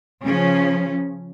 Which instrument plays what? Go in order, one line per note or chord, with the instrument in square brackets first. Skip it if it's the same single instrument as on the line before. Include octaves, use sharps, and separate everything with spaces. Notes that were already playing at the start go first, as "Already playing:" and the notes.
[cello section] C#3 F3 C#4